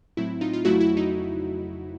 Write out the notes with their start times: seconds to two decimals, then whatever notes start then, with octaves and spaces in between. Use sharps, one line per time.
0.17 A2 F#3 A3 C4 E4
0.41 D#4 F4
0.53 F4
0.65 F2 C#3 F#3 A3 E4 F#4
0.80 E4
0.97 D#4